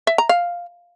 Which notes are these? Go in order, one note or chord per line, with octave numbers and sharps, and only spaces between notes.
E5
A#5
F5